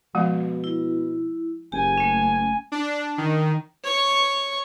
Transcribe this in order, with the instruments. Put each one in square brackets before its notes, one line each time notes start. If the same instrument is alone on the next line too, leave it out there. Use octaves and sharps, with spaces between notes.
[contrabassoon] B2 [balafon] F3 G#3 F5
[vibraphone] E4
[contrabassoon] F#1 [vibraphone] G4 [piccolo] G#5
[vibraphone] A3 C#4
[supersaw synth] D4
D#3
[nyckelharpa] C#5 C#6